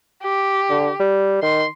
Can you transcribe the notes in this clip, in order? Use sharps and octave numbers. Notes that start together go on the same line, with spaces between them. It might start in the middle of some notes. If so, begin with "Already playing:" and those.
G4
D3
G3
D#3 C6